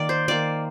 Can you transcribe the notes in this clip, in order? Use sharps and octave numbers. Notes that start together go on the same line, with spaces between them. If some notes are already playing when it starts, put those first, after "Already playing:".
Already playing: D#3 A#3 D5
C5
D#3 A#3 D5